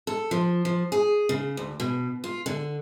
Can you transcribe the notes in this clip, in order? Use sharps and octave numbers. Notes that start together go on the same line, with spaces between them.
A4
F3
F3
G#4
C#3
D2
B2
F4
D3